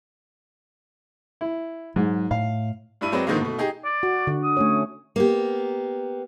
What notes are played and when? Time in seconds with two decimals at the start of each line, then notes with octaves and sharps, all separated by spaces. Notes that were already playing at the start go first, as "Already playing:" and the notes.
1.41 E4
1.96 G#2 F#3
2.31 A2 F5
3.01 G2 D4 E4 D#7
3.12 F#3 G#3 C4 B4 D5
3.27 G#2 D3 D#3 F3 G#3 A#3
3.40 B2 A3
3.58 D#4 G4 G#4
3.85 D5
4.03 F#4
4.27 D3
4.43 D#6
4.57 A3 C#4 C#5
5.16 A#3 B3 G4